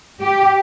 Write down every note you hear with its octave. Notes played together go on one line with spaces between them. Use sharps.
G4